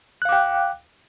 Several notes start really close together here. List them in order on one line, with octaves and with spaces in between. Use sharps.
F#6 F5 D6 G5